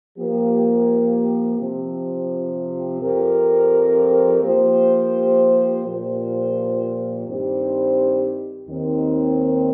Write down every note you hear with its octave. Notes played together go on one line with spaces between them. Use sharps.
F3 A#3 G4
C3 F3 C4
F2 F3 C4 G4 A#4
F3 A#3 G4 C5
A#2 F3 A#3 G4 C5
G2 D#3 C4 G4 C5
D#2 D#3 C4